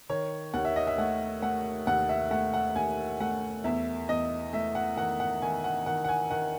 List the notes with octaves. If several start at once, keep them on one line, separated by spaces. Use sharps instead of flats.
D#3 C#5
D#2 F#5
E5
D#5
E5
A3 F#5
A3 F#5
D#2 F#5
E5
A3 F#5
F#5
D#2 G#5
A3 F#5
E2 E5
E2 D#5
A3 E5
F#5
D#3 F#5
F#5
D#3 G#5
F#5
D#3 F#5
F#5
G#5
D#3 F#5